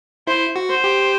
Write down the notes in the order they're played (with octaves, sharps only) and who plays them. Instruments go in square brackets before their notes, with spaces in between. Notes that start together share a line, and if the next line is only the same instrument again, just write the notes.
[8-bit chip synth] E4 [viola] C5
[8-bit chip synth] F#4
[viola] C5
[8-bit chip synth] G4